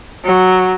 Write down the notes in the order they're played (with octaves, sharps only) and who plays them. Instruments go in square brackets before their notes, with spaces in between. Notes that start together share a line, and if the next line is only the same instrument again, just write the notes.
[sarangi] F#3